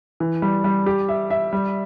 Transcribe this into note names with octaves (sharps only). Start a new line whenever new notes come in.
E3
G3
G3
G4
E5
E5
G3